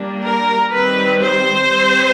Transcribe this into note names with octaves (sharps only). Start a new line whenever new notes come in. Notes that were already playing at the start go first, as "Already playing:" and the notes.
Already playing: G3 A#3 D4
A#4
D#3 G3 C4 B4
C5
G3 C4